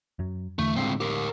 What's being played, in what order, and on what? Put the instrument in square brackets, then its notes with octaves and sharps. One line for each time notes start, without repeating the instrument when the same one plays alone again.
[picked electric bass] F#2 F#3
[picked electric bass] E2 D3 E3 [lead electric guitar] A3
[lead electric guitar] C#2 C4 [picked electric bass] A2 D3 G#3
[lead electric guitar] G4 A#4